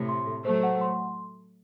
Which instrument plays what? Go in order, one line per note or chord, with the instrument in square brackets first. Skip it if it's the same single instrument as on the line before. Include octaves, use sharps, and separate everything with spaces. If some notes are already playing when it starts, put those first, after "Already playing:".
Already playing: [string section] A2 C3
[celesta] C6
A4
[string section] F#3 A3 [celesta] C5
[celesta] F#5
C6